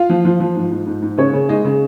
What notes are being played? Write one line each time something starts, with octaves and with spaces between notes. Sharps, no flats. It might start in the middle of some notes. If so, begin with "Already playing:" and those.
Already playing: F4 F5
F3
F3
F3
G#2
G#2
G#2
G#2
C#3 C#4 C#5
C#3
G#3 D#4 D#5
C#3